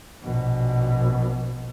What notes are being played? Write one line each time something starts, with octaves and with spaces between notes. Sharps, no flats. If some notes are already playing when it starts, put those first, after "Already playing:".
A#1 B2